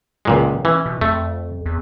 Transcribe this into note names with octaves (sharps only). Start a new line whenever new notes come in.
C#2 A#2 G#3
E3 C#4
B2
F2 A3
E2